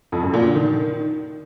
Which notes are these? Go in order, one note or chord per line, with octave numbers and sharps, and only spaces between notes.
F2
F#2
A#2
D3
D#3